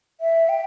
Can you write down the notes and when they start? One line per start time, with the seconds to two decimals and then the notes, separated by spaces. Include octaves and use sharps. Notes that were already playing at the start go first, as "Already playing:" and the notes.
0.21 E5
0.49 G5